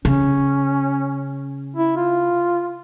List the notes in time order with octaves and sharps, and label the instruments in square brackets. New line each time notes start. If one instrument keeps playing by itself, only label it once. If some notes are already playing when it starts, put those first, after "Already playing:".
[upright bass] C#3 [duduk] C#4
[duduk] E4
F4